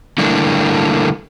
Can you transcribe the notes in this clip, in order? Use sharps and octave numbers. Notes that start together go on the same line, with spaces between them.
D3 G3 A3 A#3 D4 E4